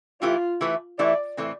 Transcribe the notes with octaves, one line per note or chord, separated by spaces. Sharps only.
E3 A3 E4 F4 G4 B4
E3 A3 E4 G4 B4
E3 A3 E4 G4 B4 D5
A2 E3 A3 C4